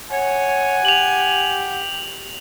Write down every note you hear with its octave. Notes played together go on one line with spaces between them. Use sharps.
C#5 F#5 G#5
G4 F7 F#7